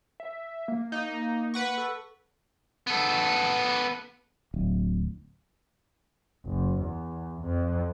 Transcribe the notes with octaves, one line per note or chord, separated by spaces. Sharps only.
E5
A#3
D#4
B4 F#5 C#6
A4
B3 A4
D1
F#1
E2
F2